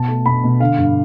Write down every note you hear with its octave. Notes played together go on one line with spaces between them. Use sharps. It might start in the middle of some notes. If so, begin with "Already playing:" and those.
Already playing: B2 A5
A3
B2 B5
B2
D3 F5
G2